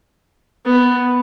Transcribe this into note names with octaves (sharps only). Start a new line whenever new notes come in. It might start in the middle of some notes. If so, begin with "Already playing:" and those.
B3